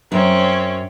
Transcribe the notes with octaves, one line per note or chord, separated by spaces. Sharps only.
F#2 C4 C#4